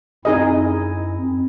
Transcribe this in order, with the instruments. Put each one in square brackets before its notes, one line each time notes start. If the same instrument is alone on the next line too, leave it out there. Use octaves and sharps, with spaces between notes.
[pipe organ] F#2 C4 E4 [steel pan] D#4 G#4 D#5